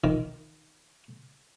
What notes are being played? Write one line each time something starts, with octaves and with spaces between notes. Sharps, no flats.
D#3